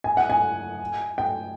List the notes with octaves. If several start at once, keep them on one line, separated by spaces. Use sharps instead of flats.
G#5
F#5
G#5
G5